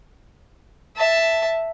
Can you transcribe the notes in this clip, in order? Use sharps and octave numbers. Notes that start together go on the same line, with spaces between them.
E5 A5